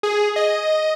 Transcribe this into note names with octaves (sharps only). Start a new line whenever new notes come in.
G#4
D#5